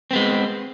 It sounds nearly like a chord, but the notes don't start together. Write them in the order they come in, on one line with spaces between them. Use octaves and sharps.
C4 B3 G#3